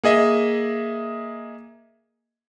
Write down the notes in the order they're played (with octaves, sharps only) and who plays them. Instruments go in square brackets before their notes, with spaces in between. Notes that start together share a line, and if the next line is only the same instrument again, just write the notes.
[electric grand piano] A#3 G#4 D#5 E5